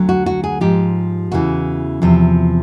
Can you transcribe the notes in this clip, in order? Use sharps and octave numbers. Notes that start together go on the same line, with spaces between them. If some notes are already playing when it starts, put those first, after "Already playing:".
Already playing: D2 D3 F#3
F#4
F#4
G#4
G#2 F3 G4
E2 C#3 E3 F#4
E2 C3 F3